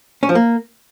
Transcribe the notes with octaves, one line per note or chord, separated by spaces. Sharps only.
C#4
F3
A#3